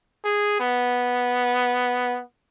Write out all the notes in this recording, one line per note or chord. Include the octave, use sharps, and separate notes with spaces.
G#4
B3